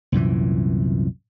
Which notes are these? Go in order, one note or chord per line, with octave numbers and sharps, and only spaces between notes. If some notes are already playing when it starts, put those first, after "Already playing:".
C2 F#2 A#2 E3